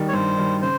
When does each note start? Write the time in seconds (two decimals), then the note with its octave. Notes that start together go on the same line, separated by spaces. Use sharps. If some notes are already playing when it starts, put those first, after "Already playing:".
Already playing: D#3 G3
0.08 C#5
0.13 G2 C5
0.37 D#3 G3
0.62 C#3 C5